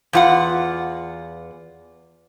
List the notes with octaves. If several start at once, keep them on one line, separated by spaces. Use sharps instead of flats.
E2 F4 F#5